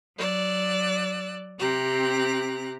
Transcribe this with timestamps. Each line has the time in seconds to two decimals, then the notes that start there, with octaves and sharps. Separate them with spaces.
0.17 F#3 D5 E6 F#6
1.59 C3 C4 G4 A#5 F#6